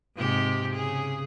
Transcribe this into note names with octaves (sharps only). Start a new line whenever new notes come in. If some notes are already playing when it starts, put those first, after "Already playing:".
G#2 C3 G4
C#3 G#4